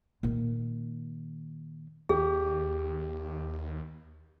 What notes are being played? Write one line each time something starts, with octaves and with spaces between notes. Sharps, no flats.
A#2 D#3
D#2 G4 G#4